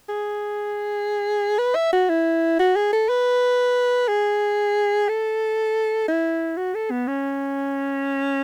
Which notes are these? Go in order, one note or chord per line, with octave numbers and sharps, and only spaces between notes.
G#4
B4
E5
F#4
E4
F#4
G#4
A4
B4
G#4
A4
E4
F#4
A4
B3
C#4